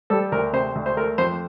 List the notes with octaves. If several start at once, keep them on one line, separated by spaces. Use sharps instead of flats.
G3 A4
D2 A#4
C3 C5
D2
C5
A3 A#4
F2 C5